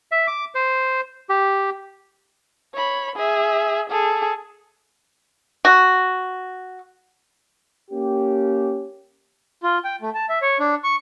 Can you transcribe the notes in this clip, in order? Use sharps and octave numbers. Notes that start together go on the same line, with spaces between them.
E5
D6
C5
G4
C#5 B5
G#4 E5
G#4 A4
F#4
A#3 C#4 G4
F4
G5
A3
A5
E5
C#5
D4
C#6